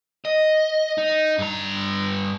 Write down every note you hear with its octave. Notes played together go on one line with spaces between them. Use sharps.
D#5
D#4
G2 A#5